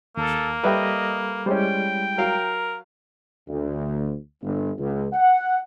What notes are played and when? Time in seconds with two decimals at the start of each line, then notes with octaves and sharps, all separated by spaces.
0.17 D#2 A#3 A4
0.64 G3 A4 B4 D#5 E5 G5
1.46 G3 G#3 C#4 E4 C5 G5
2.18 F#3 A#4 F5
3.47 D2
4.42 G1
4.78 C#2
5.13 F#5